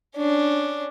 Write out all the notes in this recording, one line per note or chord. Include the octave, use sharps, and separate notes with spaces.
C#4 D4